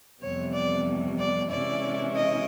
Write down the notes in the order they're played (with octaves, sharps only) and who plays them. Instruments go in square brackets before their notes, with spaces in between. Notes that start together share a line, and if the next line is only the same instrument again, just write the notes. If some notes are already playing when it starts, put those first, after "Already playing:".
[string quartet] F2 C3 E3 G3 B3 C#5
D5
D5
C3 E3 G#3 C#4 E4 D5
D#5